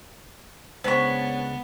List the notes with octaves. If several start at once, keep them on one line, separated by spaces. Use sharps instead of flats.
C#2 B3 D4 C5 C#5 B5